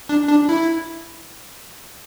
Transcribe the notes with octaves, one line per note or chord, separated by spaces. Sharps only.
D4
D4
E4